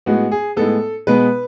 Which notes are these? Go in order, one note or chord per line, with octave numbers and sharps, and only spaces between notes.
A2 G#3 B3 F#4
G#4
A2 G#3 B3 A4
B2 G#3 B3 B4